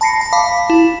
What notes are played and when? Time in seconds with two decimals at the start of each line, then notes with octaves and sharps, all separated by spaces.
0.01 A5 B5 A#6 C7 C#7
0.21 A5
0.33 F5 A5 B5 D6 B6
0.70 E4